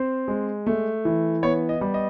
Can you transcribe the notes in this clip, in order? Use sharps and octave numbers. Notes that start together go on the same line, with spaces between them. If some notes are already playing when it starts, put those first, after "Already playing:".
Already playing: C4 C5
G#3
A3
E3
B3 C#5
D#5
G3
D#5